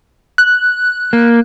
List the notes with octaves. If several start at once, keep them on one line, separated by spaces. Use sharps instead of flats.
F#6
A#3